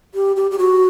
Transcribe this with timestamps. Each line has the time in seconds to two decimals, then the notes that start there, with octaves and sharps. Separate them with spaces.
0.14 G4
0.36 G4
0.51 G4
0.59 F#4